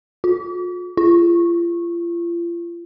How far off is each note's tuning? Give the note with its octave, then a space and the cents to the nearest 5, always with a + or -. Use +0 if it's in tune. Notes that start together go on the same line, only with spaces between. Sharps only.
F4 +40
F4 -35